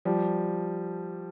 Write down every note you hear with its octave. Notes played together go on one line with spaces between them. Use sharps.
F3 G3